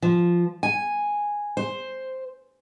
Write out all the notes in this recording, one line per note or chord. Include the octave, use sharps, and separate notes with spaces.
F3
G#5
C5